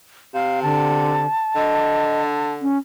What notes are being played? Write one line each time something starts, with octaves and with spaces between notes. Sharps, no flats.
C3 F5
D3 A5
D3 D#5
C#4